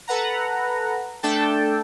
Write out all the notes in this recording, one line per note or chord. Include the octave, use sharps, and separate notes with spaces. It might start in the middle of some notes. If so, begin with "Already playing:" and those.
A4 B4 F#5 A#5
A3 D4 A4 G5 A5